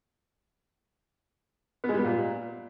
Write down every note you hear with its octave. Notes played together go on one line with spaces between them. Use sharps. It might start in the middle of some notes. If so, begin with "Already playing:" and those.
B3
G#3
G3
B3
A#2